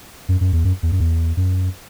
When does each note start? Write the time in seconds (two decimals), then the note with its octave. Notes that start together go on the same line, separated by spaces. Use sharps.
0.29 F#2
0.41 F#2
0.53 E2
0.65 F#2
0.83 E2
0.92 F#2
1.00 E2
1.37 F#2